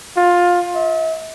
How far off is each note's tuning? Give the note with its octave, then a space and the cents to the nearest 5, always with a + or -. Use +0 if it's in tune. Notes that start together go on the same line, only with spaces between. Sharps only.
F4 +15
E5 -40